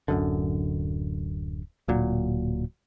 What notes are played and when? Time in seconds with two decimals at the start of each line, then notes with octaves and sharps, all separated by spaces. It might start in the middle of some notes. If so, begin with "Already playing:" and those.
0.08 D1 F#2 D3
1.88 D1 A#2 F#3